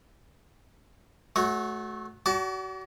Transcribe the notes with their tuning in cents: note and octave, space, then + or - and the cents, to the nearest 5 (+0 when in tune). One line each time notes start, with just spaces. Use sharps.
A3 -25 F#4 +0 C#5 +0
F#4 +30 D5 -40 A5 -15